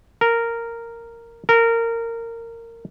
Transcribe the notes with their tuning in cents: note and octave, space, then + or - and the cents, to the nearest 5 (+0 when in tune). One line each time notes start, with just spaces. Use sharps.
A#4 -10
A#4 -20